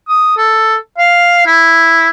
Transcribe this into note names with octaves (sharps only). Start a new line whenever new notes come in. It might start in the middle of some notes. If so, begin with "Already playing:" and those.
D#6
A4
F5
E4